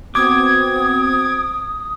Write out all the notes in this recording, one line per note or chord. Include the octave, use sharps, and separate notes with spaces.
B3 C4 F#4 D6 D#6 G#6